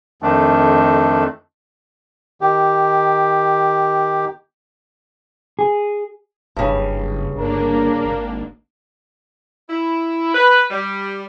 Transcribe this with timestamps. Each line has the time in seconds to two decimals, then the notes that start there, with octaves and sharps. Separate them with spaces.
0.22 F2 D#3 A3 D4
2.41 D#3 G4
5.59 G#4
6.56 F#1 G2 C#3
7.35 G1 A#3 D4 A#4
8.05 G#1
9.69 E4
10.34 B4
10.70 G3